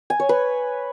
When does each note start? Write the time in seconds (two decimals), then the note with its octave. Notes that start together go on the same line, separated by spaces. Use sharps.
0.10 G#5
0.20 C#5
0.29 B4